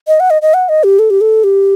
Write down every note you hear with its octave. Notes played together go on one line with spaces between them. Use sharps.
D#5
F#5
D#5
D#5
F#5
D#5
G4
A4
G4
A4
G4